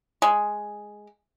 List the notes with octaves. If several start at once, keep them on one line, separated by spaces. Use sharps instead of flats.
G#3